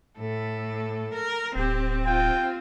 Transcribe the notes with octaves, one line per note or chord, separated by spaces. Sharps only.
A2 A4
A#4
D1 C4 G4
F4 G5